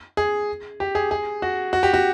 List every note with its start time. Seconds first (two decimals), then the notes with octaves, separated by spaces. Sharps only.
0.17 G#4
0.80 G4
0.95 G#4
1.11 G#4
1.42 F#4
1.73 F#4
1.83 G4
1.94 F#4